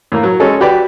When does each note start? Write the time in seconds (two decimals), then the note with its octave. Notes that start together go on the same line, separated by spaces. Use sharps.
0.12 A2 A#3
0.23 F#3
0.40 G#3 C#4 A4
0.60 F#4 G4 B4 D5 D6